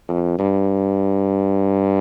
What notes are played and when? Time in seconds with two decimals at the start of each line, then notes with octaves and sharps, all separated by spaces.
0.09 F2
0.39 G2